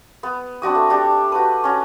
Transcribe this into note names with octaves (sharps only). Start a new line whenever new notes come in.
B3
C4 D4 F#4 D#6
A3
D4 G4 A4
F#4 B4
C#4 F#4